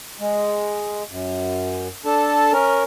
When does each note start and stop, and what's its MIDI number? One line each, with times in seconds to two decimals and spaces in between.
0.20 1.03 56
1.10 1.88 42
2.05 2.52 62
2.05 2.52 69
2.05 2.52 81
2.53 2.83 61
2.53 2.83 70